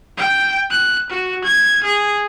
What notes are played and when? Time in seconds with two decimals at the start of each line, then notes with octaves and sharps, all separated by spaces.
0.17 G5
0.71 F#6
1.10 F#4
1.44 G#6
1.84 G#4